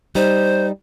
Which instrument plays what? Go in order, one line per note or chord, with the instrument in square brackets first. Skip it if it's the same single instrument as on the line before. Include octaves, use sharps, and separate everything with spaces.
[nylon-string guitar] G3 D#4 [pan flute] C5